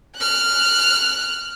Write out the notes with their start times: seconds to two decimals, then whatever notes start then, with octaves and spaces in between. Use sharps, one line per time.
0.16 F6 F#6